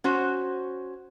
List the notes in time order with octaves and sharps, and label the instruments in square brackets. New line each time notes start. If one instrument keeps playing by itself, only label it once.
[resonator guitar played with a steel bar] C#4 F#4 C5